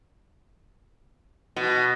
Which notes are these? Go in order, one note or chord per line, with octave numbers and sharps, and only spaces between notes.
B2